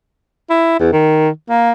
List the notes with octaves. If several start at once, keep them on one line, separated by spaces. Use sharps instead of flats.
E4
E2
D#3
A#3